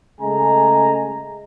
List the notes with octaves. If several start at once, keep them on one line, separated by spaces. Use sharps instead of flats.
C#3 G#3 A3 G#5 A#5